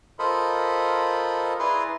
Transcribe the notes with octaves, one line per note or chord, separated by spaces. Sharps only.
F4 A4 A#4 C5 D#5 B5
E4 G#4 B4 D5 A#5 C6